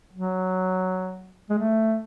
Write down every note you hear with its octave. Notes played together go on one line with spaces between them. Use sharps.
F#3
G#3
A3